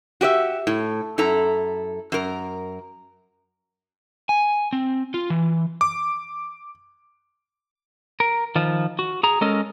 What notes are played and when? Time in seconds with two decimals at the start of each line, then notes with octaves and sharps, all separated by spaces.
0.21 F#4 G4 D5 E5
0.67 A2
1.18 F#2 E4 A4 A#5
2.12 F#2 A#4
4.29 G#5
4.73 C4
5.14 F4
5.30 E3
5.81 D6
8.20 A#4
8.56 D#3 F3
8.99 F#4
9.23 G#4 A#5
9.41 G#3 C#4 A4 A#4 D#5